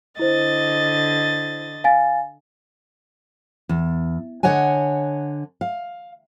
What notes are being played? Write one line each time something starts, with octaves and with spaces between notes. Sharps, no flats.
D3 E4 C5 D#5 A6
F5 G#5 A6
E2
D3 C#5 D#5 F#5 G#5
F5